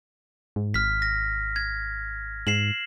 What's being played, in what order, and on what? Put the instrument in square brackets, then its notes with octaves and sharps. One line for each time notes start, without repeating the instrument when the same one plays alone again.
[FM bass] G#2
[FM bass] G#1 [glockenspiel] F6 B6
[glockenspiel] A#6
G#6
[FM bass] G#2 [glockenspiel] C7 E7 F#7